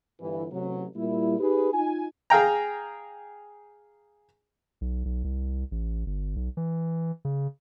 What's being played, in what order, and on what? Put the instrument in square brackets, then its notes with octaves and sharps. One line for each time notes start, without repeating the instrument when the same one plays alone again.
[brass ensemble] G1 E3
A1 C3 F#3
A#2 G3 E4
D#4 G4 G#4 B4
D#4 F4 G#5
[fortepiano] G#4 F5 G5 A#5
[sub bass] B1
B1
C2
A1
G1
B1
E3
C#3